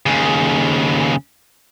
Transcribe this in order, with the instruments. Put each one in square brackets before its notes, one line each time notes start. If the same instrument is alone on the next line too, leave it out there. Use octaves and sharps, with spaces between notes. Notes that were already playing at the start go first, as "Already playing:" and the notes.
[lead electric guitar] D#2 C#3